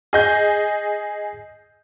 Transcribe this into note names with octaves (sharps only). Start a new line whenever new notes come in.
G#4 D#5 G6